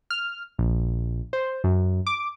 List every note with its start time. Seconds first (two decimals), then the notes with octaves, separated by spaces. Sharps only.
0.11 F6
0.59 A#1
1.33 C5
1.64 F#2
2.07 D6